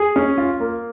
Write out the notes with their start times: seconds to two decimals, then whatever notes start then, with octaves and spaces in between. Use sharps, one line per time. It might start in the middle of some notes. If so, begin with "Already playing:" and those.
Already playing: G#4
0.16 C#4
0.38 F4
0.60 A#3